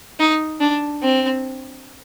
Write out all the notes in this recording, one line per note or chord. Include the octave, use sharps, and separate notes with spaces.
D#4
D4
C4